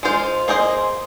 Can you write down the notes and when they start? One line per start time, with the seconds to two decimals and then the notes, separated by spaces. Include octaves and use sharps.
0.03 G#3 F4 C5
0.48 A#3 G#4 C5 D#5